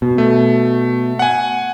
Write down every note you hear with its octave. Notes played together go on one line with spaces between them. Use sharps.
B2
A3
F#5 G#5